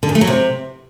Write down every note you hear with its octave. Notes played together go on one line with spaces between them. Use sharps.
D3
E2
A3
F#3
C3